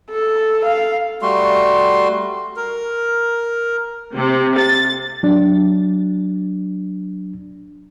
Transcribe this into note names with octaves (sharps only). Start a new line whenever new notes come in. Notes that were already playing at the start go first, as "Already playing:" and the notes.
A4
F5
G3 A3 F#4 C6
A#4
C3
A6
F#3 D4